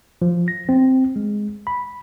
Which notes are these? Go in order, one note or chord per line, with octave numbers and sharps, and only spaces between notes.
F3
A#6
C4
G#3
B5